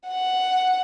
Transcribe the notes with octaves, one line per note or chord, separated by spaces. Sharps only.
F#5